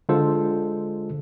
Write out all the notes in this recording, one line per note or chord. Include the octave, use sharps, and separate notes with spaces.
D3 G#3 F4 A4 C5